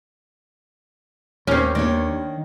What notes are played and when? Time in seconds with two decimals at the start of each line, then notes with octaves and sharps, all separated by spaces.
1.47 D#2 C4 C#4
1.75 D#3 A#3 D4 C#5